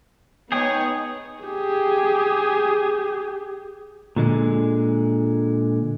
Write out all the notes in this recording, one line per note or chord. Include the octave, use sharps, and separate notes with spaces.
B3 D#4 G#4 C#5 G5 D#6
G4 G#4
A#2 D3 G#3